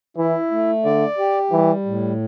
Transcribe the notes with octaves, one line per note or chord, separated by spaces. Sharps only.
E3 E4
A3
D3 D5
G4
E3 G3
A2